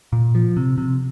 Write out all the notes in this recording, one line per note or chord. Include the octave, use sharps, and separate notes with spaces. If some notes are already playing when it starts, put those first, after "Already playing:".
A#2
F3
C3
C3